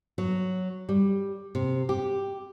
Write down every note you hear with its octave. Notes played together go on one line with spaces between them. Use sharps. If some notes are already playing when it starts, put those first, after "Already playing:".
F#3
G3
C3
G4